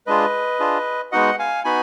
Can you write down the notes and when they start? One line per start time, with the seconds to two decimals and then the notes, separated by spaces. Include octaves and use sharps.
0.07 G#3 D4 F4 G#4 B4 D#5
0.59 D4 F4 G#4
1.12 G#3 B3 D#4 F#4 D#5 F#5
1.39 F5 G#5
1.64 B3 D#4 F#4 G#5 B5